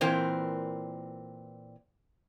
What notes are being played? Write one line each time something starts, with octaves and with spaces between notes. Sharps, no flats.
A#2 E3 C4 A#4